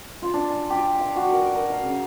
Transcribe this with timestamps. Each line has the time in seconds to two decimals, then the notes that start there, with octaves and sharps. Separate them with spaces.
0.22 F4
0.34 D4
0.50 G#5
0.70 G4
0.99 F5
1.16 F#4
1.30 A#4
1.42 D6
1.54 A#4
1.70 F5
1.83 C#3